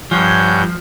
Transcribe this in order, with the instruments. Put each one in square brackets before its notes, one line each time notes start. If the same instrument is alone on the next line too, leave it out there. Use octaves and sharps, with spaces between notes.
[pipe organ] G2 G6 [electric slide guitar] F3 [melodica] C#5 F#5 G#5